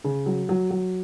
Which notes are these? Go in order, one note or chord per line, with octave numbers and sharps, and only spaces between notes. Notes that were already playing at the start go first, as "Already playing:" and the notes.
C#3
F#3
F#3
F#3